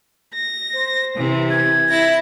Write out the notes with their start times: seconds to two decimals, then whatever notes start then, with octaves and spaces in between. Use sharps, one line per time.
0.33 A#6
0.73 C5
1.16 C3 E3
1.50 G#6
1.88 E4 A#6